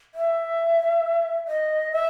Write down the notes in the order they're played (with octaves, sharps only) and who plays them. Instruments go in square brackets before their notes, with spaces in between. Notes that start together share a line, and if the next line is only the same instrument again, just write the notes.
[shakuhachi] E5
D#5
E5